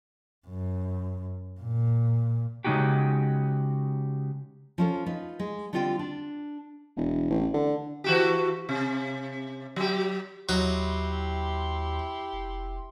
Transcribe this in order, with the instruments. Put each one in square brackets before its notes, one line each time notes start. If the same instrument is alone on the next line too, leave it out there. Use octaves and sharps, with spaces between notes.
[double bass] F#2
A#2
[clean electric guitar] C#3 G#3 A3 D#4 F#4 G4
[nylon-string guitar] F3 C#4 A4
D#4 F4 B4
G#3
D3 G3 C4 F4 F#5 G5
D4
[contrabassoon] E1
A1
D3
[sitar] E3 F#4 G4
C3
F#3 G4
[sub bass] D#2 [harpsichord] F#3 D#4 [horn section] E4 G4 C6
[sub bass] F1